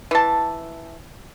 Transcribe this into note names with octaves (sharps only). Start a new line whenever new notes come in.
E3 A5